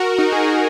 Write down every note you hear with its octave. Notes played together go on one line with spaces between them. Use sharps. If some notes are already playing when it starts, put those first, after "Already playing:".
Already playing: F#4 A#4
D#4 F#4
G#4
D#4 F#4